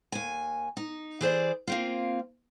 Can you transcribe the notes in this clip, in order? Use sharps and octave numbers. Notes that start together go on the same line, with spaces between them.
D#2 G#5
D#4
E3 G#4 C5 D5
A#3 C4 F4